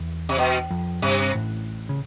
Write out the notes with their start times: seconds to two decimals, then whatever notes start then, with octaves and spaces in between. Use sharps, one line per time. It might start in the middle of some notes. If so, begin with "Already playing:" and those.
Already playing: E2
0.29 C3
0.38 B2
0.71 F2
1.02 G1 G2 C3
1.34 A1 A2
1.89 C#3